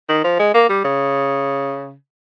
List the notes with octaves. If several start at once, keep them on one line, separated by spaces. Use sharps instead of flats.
D#3
F3
G#3
A#3
G3
C#3